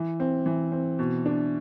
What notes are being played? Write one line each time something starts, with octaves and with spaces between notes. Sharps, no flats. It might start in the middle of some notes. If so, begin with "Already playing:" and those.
Already playing: E3
C4
E3
C4
B2
D4